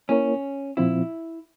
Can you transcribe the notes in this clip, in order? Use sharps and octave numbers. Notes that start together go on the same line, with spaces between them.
A#3 C#4 E4 A#4 C#5
A#2 F3 C4 E4 F4